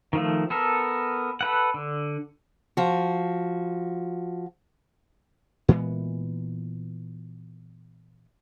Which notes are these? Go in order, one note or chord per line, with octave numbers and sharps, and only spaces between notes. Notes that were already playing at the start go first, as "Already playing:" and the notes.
D#3 F3 A3
B3 A4 A#4
A4 B4 F#5
D3
F3 F#4
A#2 E3 G#3 B3